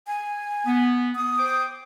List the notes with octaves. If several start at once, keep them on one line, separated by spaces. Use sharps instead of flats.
G#5
B3
D#6
C5 G5 D6